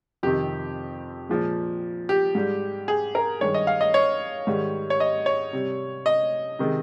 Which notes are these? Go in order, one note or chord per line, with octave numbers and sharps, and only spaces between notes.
F2 C3 D#3 G4
A#2 F3 G#3
G4
G#2 G3
G#4
A#4
G2 D#3 G#3 C#5
D#5
F5
D#5
C#5
G#2 D#3 G3
C#5
D#5
C#5
C3 G3
D#5
C3 D#3 G#3